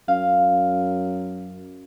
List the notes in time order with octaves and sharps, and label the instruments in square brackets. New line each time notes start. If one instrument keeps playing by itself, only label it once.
[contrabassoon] F#2 [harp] F5